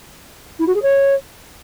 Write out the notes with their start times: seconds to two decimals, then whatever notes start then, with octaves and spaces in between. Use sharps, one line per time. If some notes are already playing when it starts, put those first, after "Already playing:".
0.59 E4
0.67 F#4
0.74 G#4
0.82 C#5